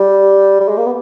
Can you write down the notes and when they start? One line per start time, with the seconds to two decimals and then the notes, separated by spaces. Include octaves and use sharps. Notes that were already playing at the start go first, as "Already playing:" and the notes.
Already playing: G3
0.60 G3
0.69 G#3
0.77 A#3
0.86 B3